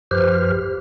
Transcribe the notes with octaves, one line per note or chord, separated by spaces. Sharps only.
F#2 F3 G4 B4 C5 F6